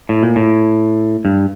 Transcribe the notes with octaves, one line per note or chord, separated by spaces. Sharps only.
A2
A#2
A2
G2